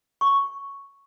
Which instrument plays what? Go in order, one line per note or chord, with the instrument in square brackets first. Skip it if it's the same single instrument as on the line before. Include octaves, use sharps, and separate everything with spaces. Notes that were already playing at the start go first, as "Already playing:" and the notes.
[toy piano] C#6